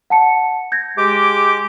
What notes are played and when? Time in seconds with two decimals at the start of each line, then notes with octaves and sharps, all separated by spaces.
0.10 F#5 A5 C#7
0.72 G6 G#6 A#6
0.98 G#3 G4 D6